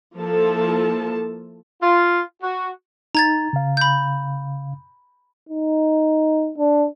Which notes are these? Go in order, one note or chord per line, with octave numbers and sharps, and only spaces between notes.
F3 A#3 E4 F4 A4 A5
F4
F#4
D#4 A#5 G#6 A6
C#3 F5
B5 G6
D#4
D4